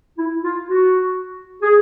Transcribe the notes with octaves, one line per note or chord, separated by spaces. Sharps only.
E4
F4
F#4
G#4